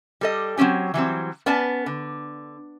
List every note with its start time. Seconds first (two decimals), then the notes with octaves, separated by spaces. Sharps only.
0.21 G3 A4 D#5
0.57 F#3 G#3 C4 C#4 G4
0.94 E3 F#3 G3 C4
1.46 B3 C#4 B4 D5 A5
1.86 D3